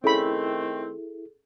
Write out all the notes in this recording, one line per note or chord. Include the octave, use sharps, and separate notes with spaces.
D#3 A3 C4 C#4 E4 G#4 A4 B5